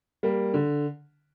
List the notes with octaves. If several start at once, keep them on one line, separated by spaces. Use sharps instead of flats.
G3 A#3
D3